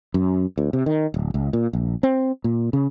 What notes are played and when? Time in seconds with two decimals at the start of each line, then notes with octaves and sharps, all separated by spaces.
0.14 F#2
0.58 D2
0.73 C3
0.86 D#3
1.14 D1
1.34 C#2
1.53 A#2
1.73 A#1
2.03 C4
2.44 A#2
2.73 C#3